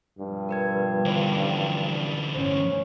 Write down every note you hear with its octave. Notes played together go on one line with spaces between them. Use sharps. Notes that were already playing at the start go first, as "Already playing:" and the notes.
G2 B2 F3 G3
A#4 B4 G#6
D3 E3 C5 D5
G1 A2 C#4 C5 C#5